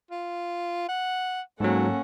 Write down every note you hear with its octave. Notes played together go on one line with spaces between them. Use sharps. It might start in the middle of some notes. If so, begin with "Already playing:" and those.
F4
F#5
G#2 F#3 A#3 C#4 A4 F#5